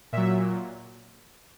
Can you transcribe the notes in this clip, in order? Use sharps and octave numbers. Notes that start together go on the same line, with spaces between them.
A#2 F#3 E5